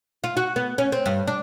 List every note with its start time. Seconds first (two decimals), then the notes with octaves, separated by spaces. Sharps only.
0.24 F4
0.37 F#4
0.56 B3
0.78 C#4
0.92 C4
1.06 G2
1.27 D4